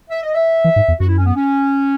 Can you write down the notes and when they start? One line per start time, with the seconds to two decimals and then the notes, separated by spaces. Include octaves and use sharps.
0.10 E5
0.23 D#5
0.35 E5
0.64 E3
0.76 G#2
0.88 E2
1.00 F#2 F#4
1.08 E4
1.18 C#4
1.26 B3
1.36 C#4